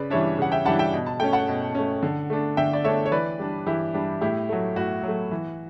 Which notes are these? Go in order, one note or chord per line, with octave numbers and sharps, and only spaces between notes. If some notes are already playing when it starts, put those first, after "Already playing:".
Already playing: C#3 B4 D5
E3 G3 D4 C#5 E5
C#3 F#5
E5 G5
E3 G3 D4 F#5 A5
E5 G5
B2
A5
A3 C#4 G5
F#5 A5
B2
A3 C#4
D3
A3 D4
D3 E5 G5
D5
A3 D4 C#5 E5
C#5
E3 B4 D5
G3 D4
E3 E4 G4
G3 D4
A2 E4 G4
F#3 A3
A2 F#4
F#3 A3
E3